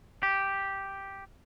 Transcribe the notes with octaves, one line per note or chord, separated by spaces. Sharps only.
G4